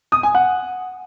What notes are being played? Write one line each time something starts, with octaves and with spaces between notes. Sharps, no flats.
D#6
G#5
F#5